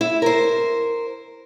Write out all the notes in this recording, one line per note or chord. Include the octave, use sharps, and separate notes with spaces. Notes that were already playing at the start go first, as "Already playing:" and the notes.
E4
A#4 C5